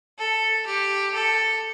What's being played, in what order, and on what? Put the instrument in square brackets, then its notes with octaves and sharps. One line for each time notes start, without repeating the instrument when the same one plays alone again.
[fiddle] A4
G4
A4